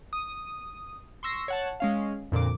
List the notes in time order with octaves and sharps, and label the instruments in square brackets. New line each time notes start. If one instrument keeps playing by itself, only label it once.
[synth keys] D#6
C6 C#6 E6 A#6 C7
C#5 F#5 A5
G#3 C#4 F5
F2 A#2 D3 D6